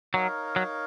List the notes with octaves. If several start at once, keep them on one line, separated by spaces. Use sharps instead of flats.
F#3 D#4 A#4 C#5 F5
F#3